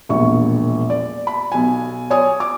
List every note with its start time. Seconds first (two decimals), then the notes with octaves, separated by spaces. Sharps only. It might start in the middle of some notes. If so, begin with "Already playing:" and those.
0.09 E1 A#1 C#6
0.90 D5
1.27 B5
1.52 B1 G#5
2.10 C#5 D5 G#5 D#6
2.40 D6